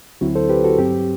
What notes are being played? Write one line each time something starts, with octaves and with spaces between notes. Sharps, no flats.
D2 D3 F#3 C4 E4 F#4
A4 C5
G4 B4
F#4 A4
G2 F#3 C4 G4